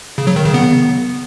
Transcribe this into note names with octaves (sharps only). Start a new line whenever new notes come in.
C#3
F#3
D#3
C#3
B3